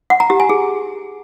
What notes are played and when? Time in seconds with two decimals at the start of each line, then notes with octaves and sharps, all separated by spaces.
0.10 F#5
0.20 A#5
0.30 G4
0.40 G#5
0.49 G#4